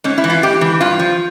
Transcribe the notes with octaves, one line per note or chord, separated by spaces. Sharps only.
G#2 C#4
E4
E3
F4
G#2 G4
E3
G2 F4
F3